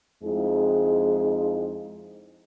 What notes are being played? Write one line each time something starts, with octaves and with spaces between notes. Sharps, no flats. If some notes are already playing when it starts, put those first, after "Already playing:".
F2 G#3 D#4 E4 G#4